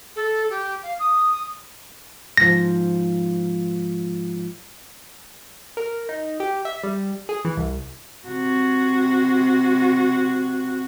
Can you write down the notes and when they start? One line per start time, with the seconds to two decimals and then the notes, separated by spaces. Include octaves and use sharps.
0.15 A4
0.49 G4
0.82 F5
0.99 D#6
2.37 G#2 F3 A#6
5.77 A#4
6.09 D#4
6.40 G4
6.65 E5
6.83 G3
7.29 G#4
7.45 E3
7.57 C2
8.27 C3 F#4